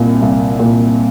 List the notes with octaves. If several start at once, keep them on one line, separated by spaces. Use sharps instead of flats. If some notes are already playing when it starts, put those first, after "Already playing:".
Already playing: C2 A#2
C2
A#2